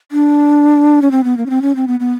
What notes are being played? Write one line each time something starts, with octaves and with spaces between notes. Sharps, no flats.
D4
C#4
C4
B3
A#3
C#4
C4
C#4
C4
B3
B3